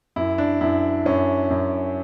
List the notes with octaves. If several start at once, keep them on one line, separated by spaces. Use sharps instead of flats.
F#2 E4
D4
F#2 E4
F#2 C#4
F#2